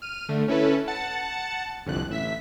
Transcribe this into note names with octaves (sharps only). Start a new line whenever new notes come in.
F6 D#7
D3 A3
C#4 E4 A4 B4
F#5 A5 A6 C#7
G1 C2 F2 F#6
A1 E5 B6